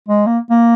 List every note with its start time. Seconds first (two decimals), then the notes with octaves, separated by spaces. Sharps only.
0.08 G#3
0.26 A#3
0.51 A#3